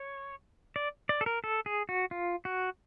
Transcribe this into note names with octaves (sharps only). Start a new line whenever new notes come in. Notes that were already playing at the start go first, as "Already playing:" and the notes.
Already playing: C#5
D5
D5
A4
A#4
A4
G#4
F#4
F4
F#4